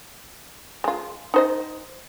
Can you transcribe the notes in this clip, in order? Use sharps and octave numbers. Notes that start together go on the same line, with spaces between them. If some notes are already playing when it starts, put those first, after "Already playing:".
G#3 F4
D#4 C5 D#5